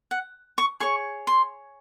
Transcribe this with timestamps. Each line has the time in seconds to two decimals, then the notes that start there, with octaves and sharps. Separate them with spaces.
0.11 F#5
0.58 C#6
0.80 G#4 C#5 C#6
1.27 C6